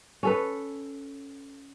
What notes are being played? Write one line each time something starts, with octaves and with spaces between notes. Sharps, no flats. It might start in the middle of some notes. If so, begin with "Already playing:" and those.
C#4 A4 B4